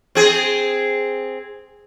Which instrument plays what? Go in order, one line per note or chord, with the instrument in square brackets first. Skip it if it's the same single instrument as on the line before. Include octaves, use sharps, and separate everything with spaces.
[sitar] C4 G#4